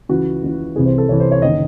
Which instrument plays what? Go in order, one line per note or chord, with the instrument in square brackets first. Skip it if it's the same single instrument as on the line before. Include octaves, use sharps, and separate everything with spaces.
[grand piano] C#2 C#3 E3 F#4
C#2 C#3 E3
C2 C3 E3 G#4
C5
A4
C2 C3 E3 C#5
C5
C#5
F#1 D#3 D#5